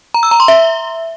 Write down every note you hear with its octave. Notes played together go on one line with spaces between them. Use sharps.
A#5
E6
A#5
C6
E5